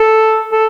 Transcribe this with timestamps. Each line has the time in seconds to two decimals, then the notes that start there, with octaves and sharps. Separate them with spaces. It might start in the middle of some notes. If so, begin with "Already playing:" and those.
Already playing: A4
0.52 A4